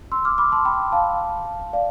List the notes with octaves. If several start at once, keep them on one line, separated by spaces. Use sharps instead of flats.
C6 E6
D6 F6
B5 D6
A5 C6
G5 B5
F5 A5
D5 F5